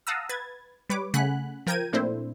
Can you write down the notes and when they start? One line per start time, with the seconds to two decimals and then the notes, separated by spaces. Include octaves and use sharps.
0.07 F5 F#5 A5 A#5 D#6 E6
0.29 B4 G#6 A6
0.89 G3 B4 C#5 D6
1.14 C#3 A3 F#5 G#5 B5 F#6
1.67 F3 A#4 G5 A#5 G#6 D#7
1.93 A#2 A3 C4 D4 E4 C5